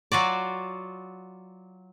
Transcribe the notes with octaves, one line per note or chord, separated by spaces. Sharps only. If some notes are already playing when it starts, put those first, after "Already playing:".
F#3 F4 F#4 D5